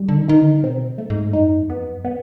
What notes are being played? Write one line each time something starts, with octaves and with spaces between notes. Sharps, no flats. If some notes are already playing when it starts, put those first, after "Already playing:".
Already playing: G3
D3
D#3
D#3 D#4
D3
B2 C4
A3
G#2
F#2 D#4
E2
F2 B3
F#2
B3